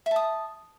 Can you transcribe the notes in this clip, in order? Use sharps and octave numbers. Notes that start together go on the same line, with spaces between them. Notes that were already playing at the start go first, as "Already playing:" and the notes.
E5 A5 D#6